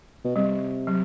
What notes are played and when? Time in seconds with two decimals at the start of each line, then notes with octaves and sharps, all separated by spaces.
0.25 B2
0.36 C3 G3
0.87 F#3